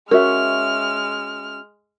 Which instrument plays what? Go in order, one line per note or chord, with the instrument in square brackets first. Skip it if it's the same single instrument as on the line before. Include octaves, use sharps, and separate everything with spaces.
[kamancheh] G#3 F6 [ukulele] C#4 F#4 E5 [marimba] A#4